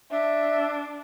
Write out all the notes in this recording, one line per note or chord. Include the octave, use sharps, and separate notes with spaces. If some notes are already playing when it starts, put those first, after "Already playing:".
D4 E5